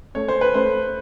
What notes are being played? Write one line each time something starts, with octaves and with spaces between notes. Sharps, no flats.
A3 C#5
C5
B4
A3 C5